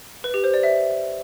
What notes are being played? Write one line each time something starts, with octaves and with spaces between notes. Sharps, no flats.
B4
G4
C5
D5
E5